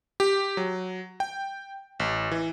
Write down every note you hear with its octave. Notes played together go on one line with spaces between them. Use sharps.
G4
F#3
G5
A1
E3